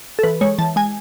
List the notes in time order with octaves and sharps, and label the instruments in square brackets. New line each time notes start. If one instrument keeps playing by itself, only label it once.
[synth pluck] A4
E3 B4
G#3 C#5
E3 A5
G#3 G#5